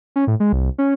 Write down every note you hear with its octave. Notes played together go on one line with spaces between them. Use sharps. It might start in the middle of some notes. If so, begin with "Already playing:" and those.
C#4
A2
G#3
C2
C#4